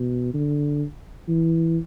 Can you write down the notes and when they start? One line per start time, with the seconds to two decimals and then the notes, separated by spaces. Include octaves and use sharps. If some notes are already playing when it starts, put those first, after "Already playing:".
Already playing: B2
0.34 D3
1.28 E3